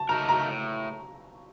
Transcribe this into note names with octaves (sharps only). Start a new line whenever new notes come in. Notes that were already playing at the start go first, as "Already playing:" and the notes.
Already playing: A5
A3 D#4 A#4 A#5
A#5
A2